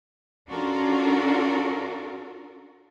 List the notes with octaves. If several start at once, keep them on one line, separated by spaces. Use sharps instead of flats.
C#4 D4 F4 F#4 A4 A#4